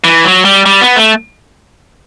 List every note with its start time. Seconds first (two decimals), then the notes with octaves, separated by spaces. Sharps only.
0.04 E3
0.25 F#3
0.45 G3
0.66 G3
0.81 B3
0.96 A3